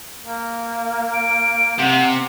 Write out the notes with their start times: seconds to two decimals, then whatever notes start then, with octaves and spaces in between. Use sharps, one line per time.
0.23 A#3
1.13 D7
1.79 C3 F#5